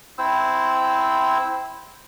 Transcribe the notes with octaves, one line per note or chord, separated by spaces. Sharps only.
C4 E4 C5 E6